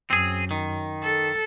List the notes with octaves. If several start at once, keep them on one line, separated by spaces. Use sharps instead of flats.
F#2 C4 G#4
D#3
A4